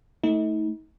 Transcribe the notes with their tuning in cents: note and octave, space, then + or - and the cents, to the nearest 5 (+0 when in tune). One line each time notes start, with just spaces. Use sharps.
A3 +0 D#4 +40